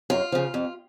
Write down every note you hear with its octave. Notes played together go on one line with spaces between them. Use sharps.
F#2 F4
C#3 F3
F2